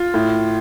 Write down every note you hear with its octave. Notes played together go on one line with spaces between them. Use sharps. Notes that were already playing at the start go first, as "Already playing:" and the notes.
Already playing: F4
A2